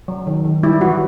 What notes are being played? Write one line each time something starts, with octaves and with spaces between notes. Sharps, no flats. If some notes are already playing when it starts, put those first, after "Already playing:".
F#3
D#3
D#3
G3 E4
E3 F#4